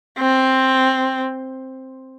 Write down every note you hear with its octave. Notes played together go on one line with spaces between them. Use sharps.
C4